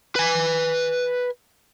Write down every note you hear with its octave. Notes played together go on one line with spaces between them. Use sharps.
B4 G#5